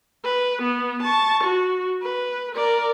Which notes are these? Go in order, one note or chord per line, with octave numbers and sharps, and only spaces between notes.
B4
B3
A5 C#6
F#4
B4
A#4 D5